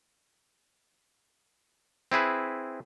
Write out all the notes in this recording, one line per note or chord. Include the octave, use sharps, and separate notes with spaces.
C4 E4 G#4 B4